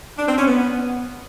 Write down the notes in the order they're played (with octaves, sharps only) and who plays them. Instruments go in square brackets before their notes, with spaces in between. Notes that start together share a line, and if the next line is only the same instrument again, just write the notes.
[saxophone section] D4
C4
C#4
B3